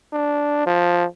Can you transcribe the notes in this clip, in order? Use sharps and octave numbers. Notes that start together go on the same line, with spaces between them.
D4
F3